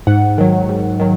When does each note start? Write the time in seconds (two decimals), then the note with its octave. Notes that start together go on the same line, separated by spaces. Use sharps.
0.07 G#2 F#5
0.38 D#3 F#3
0.69 G#2
1.00 D#3 F#3